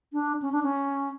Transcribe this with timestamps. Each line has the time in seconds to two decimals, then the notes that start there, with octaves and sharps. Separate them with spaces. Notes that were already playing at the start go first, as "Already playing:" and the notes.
0.13 D4
0.42 C#4
0.52 D4
0.63 C#4